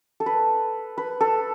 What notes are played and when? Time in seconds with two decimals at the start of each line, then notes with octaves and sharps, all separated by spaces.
0.20 A4
0.26 B4
0.98 B4
1.21 A4